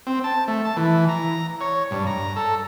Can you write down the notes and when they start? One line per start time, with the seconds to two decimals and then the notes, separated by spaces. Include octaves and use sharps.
0.07 C4
0.24 A5
0.48 A3
0.65 A5
0.77 E3
1.09 A#5
1.61 C#5
1.91 G2
2.07 A#5
2.36 A4